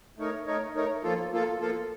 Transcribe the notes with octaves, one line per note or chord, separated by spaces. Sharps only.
A3 D#4 A#4 C#5
A3 D#4 A#4 C#5
A3 D#4 A#4 C#5
F3 A#3 F4 A4
F3 A#3 F4 A4
F3 A#3 F4 A4